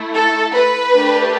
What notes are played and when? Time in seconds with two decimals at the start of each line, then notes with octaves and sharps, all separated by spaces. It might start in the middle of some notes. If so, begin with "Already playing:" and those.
Already playing: A3 E4
0.13 A4
0.54 B4
0.95 A3 D4 G4